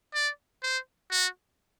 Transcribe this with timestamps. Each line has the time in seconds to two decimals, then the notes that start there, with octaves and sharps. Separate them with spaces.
0.14 D5
0.63 C5
1.11 F#4